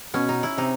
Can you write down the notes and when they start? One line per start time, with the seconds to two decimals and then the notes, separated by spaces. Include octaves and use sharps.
0.14 B2 C#4
0.29 D#4
0.43 E4
0.58 C3 D#4